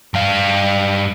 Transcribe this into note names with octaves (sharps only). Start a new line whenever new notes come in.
G2 F5